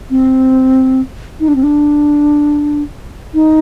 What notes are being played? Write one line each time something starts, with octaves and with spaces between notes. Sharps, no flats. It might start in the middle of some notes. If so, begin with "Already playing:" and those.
C4
D#4
D4
C4
D4
D#4